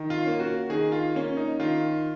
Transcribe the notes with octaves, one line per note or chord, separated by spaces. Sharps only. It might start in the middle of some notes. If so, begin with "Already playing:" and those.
Already playing: D#3
F4
A#3 C#4
F#4
D#3 G#4
F4
A#3 C#4
D#4
D#3 F4